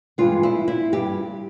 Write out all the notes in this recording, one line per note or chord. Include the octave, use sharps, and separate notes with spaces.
G2 E3 G#3 F4
E4
E4
G2 G3 G4